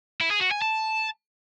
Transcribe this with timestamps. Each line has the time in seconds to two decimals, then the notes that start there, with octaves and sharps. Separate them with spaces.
0.21 E4
0.31 G#4
0.41 F#4
0.52 G#5
0.62 A5